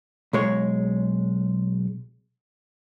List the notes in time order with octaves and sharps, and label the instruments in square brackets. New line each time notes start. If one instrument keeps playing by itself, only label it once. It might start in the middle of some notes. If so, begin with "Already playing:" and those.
[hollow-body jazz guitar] B1 G#3 C#5